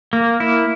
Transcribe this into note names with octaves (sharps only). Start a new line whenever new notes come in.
A#3
E4